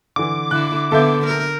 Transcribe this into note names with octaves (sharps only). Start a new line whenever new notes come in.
D3 E3 D6
D3 E4 F#6
D3 B3 A4 E5 G6
A#4